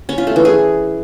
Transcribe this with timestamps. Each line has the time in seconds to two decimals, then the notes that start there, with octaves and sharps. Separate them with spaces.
0.09 C#4
0.18 F4
0.27 A3
0.36 E3
0.45 G#4